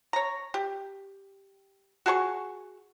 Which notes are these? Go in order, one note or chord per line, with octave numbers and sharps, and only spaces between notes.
C#5 A#5
G4
F#4 G#4 A5 C#6